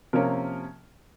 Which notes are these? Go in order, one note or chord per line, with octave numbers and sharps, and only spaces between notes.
C3 F3 A#3 C#4 A#4